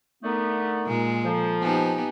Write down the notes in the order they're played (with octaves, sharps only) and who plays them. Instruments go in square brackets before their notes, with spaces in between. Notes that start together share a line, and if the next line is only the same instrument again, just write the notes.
[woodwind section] D3 A3 B3 [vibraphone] D#4 A#4 A#5
[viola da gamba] A#2 G#3
[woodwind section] F3 [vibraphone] A4 A#5
[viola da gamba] B3 D#4 G4 [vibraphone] G#5 A5